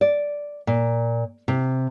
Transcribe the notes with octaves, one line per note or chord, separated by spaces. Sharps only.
D5
A#2
C3